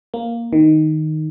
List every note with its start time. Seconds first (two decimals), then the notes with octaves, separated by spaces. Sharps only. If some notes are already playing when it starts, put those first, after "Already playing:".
0.14 A#3
0.53 D#3